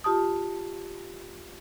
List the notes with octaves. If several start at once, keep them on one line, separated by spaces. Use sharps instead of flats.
F4 G4 A5 D#6